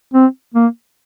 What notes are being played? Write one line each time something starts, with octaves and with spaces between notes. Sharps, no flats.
C4
A#3